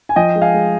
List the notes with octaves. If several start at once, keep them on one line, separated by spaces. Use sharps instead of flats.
G#5
F3 D#5 G5
G#3
F5 G#5
G#3